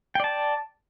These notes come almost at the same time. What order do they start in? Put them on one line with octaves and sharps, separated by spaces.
G5 D5 A5